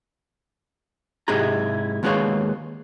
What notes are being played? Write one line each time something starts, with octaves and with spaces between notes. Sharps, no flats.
G#2 C3 E4 G4 G#4 A#5
D#2 G#3 B3 G#4 C#5 F5